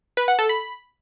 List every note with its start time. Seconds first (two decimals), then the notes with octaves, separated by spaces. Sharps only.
0.17 B4
0.28 F#5
0.39 A4
0.49 B5